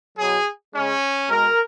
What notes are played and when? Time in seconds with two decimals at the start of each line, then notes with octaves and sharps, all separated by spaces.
0.16 B2 F#3 G#4
0.73 C#3 G#3 C#4
1.29 B2 G#3 A#4